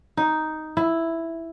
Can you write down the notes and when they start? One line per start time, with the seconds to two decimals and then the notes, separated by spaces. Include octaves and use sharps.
0.17 D#4
0.77 E4